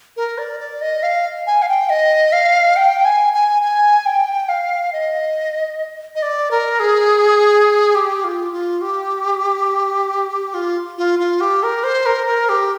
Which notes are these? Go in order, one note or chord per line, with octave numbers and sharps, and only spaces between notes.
A#4
D5
D5
D#5
F5
G#5
F5
G5
D#5
F5
G5
G#5
G#5
G#5
G5
F5
D#5
D#5
D5
A#4
G#4
G4
F4
F4
G4
F4
F4
F4
G4
A#4
C5
A#4
A#4
G4